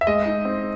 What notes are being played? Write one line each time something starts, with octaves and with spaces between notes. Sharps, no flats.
E5
G#3 D#5
D#4
C4